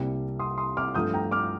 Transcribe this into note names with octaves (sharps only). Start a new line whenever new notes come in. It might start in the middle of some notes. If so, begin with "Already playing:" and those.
Already playing: C2 C3 G3 A#3
C6 D#6
C6 D#6
D6 F6
G2 F3 A3 D#6 G6
G5 A#5
D6 F6